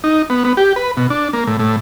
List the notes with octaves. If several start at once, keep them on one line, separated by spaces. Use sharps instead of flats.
D#4
B3
B3
G4
B4
B2
D4
A#3
A2
A2